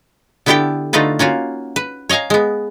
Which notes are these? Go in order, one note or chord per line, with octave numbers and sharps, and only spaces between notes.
D3 B3 E4 G4 A4 G5
D3 A3 D#4 F4 A4 B4
A#3 C#4 F4 F#4
B4
C#5 D#5 F5 G#5 A#5
G#3 B3